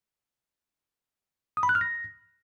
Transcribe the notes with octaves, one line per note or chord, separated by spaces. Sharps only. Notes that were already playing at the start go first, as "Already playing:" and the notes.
D#6
B5
F#6
F6
A#6